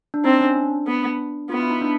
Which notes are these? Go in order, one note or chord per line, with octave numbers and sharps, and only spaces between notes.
D4
C4 D#4
C#4
D4
B3
B3 F4
E4
D#4
D4